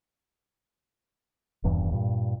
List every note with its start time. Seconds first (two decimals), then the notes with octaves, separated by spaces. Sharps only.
1.64 D#1 E2 G2 E3
1.92 G2 A#2